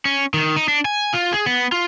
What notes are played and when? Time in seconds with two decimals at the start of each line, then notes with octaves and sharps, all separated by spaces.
0.05 C#4
0.34 D#3
0.56 D#4
0.68 D4
0.85 G#5
1.13 F4
1.33 G#4
1.46 B3
1.72 F4